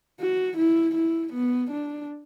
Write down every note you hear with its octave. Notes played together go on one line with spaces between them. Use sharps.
F#4
E4
E4
B3
D4